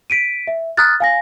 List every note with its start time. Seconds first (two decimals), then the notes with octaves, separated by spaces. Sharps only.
0.10 B6 D7 D#7
0.47 E5
0.77 A#5 D#6 F6 F#6 A6
1.00 F5 G#5 A#6